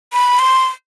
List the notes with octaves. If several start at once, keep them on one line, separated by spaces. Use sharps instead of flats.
B5
C6